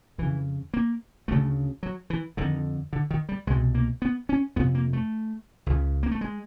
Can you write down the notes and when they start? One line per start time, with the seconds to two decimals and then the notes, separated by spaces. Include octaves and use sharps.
0.18 F2 C#3 E3
0.74 A#3
1.28 D2 C#3 A3
1.83 F#3
2.10 E3
2.37 F2 D3 D#3
2.93 D3
3.11 D#3
3.29 G3
3.47 C2 G#3
3.51 B2
3.75 A#3
4.02 B3
4.29 C#4
4.56 F2 B3
4.59 C3
4.75 A#3
4.93 A3
5.66 C#2 C#3
6.03 A#3
6.11 A3
6.21 G#3